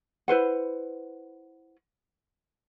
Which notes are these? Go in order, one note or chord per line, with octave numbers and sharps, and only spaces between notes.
E4 B4 C5 F#5